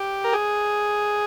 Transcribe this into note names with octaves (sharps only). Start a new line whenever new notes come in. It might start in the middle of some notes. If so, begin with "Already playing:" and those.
Already playing: G4
A#4
G#4